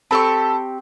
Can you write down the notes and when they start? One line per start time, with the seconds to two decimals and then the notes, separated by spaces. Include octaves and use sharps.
0.11 C4 G4 A4 A5 B5 C#6